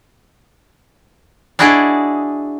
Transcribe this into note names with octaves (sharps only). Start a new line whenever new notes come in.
D4 E4 F#4 G#4 D5 D#5